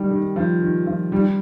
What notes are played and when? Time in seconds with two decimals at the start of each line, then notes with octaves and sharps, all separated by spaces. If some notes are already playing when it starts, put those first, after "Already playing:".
Already playing: D#3 G3
0.10 D#3 G3
0.36 F3
0.61 D#3
0.86 F3
1.12 D#3 G3